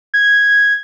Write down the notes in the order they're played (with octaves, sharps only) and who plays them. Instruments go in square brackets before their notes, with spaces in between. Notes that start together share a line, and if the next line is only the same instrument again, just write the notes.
[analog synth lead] G#6